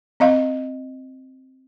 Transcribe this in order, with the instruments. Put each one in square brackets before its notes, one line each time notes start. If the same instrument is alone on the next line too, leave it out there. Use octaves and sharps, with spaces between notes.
[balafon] C4 D#5 F5